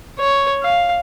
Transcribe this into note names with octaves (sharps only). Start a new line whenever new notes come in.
C#5
F5